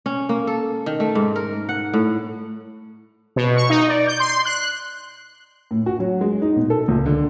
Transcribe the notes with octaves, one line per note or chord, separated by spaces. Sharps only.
C#4
A#3
A4
D#3
A3
G#2
A#4
F#5
A2
B2
C#6
D#4
D5
G6
C6
F#6
A2
F#4
F#3
G#3
D#4
B2
A4
C#2
D3